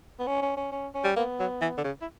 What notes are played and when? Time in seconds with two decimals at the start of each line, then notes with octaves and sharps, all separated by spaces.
0.19 B3
0.27 C#4
0.42 C#4
0.57 C#4
0.72 C#4
0.94 C#4
1.04 G3
1.16 A#3 B3
1.39 F#3
1.61 E3
1.77 D3
1.84 C#3
2.01 E4